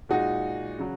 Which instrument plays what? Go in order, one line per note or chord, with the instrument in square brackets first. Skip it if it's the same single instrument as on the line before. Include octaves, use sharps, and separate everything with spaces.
[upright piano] A#2 G#3 D#4 F#4
C#3 F#3